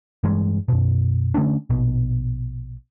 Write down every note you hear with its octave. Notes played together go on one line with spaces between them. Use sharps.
G2 E3 G#3
F#2 B2
D3 A3 C#4 D4
A#1 B2